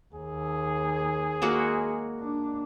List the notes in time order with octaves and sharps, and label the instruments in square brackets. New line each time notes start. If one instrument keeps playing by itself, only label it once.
[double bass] D#2 [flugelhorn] G#4
[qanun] G#3 A#3 F#4
[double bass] D4